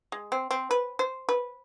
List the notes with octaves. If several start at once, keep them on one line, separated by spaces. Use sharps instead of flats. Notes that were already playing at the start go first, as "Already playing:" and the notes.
G#3
C4
C4
B4
C5
B4